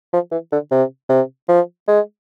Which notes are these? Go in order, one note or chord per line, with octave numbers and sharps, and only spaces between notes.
F3
E3
D3
C3
C3
F3
G#3